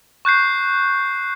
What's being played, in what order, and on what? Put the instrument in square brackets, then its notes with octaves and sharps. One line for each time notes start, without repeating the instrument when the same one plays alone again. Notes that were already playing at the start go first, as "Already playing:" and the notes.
[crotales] C#6 F#6 G6 C7